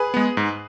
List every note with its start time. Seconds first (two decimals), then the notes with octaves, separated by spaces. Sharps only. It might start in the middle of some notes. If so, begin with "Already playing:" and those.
Already playing: G#4 B4
0.14 G#3 B3
0.37 G#2